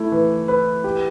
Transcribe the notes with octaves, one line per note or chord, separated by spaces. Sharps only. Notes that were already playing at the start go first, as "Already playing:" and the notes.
Already playing: A3 E4
E3
B4
G4